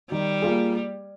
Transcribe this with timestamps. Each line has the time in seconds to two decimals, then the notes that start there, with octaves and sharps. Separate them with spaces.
0.12 D#3 G3
0.42 A#3 F4 G#4